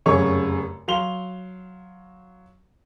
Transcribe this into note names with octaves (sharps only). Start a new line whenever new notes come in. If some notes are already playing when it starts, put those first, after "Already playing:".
F1 F#2 C#3 C#5 C#6
F#3 F5 C6 F7 G7